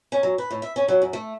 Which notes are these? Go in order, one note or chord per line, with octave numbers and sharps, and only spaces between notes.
C#4
F#3
B4
A2
E5
C#4
F#3
F#2
A3